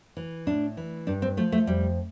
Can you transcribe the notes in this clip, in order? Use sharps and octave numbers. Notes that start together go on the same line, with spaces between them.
E3
A2 D4
E3
G2 D4
C4
F3 A3
A3
F2 G3